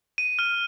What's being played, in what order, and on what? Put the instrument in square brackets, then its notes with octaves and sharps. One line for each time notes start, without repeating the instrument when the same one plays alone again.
[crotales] D#7
F6